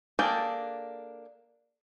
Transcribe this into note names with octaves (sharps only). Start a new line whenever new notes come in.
A#3 D4 G#4 A4 G5